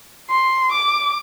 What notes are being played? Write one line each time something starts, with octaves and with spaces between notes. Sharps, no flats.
C6
D6